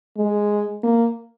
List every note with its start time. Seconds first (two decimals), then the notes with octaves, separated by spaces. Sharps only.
0.17 G#3
0.84 A#3